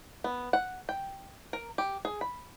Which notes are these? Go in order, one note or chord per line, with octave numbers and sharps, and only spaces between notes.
B3
F#5
G5
A#4
G4
G#4
B5